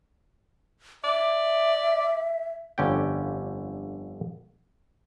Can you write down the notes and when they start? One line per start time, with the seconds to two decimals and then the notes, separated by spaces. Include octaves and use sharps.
1.04 D5 E5
2.78 G1 F2 D3 C#4 G4 G5